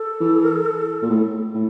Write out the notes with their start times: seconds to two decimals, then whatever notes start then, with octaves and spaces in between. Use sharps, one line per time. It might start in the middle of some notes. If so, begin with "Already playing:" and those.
Already playing: A4
0.20 E3
1.02 A#2
1.10 A2
1.54 A2